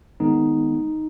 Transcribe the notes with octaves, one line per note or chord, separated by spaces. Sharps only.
D#3 G#3 B3 D#4